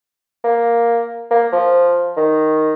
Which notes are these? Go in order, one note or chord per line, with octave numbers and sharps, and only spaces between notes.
A#3
A#3
F3
D#3